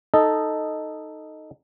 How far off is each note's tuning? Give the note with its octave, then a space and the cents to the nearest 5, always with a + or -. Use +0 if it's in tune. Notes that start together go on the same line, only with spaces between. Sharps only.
D#4 +0 A4 +0 D#5 -5